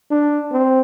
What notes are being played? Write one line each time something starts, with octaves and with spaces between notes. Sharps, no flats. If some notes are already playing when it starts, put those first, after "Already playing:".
D4
C4